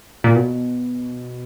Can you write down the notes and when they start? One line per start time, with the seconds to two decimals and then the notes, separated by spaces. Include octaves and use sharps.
0.24 A#2
0.36 B2